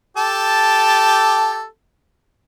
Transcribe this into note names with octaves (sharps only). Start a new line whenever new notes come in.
G4 A4 A5